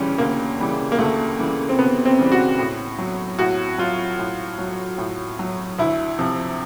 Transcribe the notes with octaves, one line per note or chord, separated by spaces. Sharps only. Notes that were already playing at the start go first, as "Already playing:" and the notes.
Already playing: D2 C#3 E3 G3 C#4
D2 A#3
C#3 E3 G3
A#3
D2 A3
C#3 E3 G3
C4
D2 B3
C4
C#3 E3 G3
F#4
A2
F#3
A2 F#4
F#3 F4
A2
F#3
A2
F#3
D2 E4
C3 F3